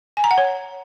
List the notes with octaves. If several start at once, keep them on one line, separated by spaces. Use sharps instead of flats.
G#5
A#5
F#5
C#5